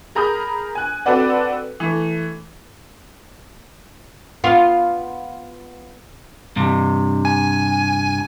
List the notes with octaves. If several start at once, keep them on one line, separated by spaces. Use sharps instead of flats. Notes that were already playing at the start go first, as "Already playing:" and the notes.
G#4 A#4 A#5 B5 D#6 G6
G#5 F#6
C4 F#4 A4 B4 D5 F#5
E3 A3
B3 F4
G2 C3
G#5